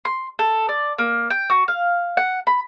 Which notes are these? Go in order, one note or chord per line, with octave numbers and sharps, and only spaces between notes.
C6
A4
D5
A#3
G5
F#4
F5
F#5
B5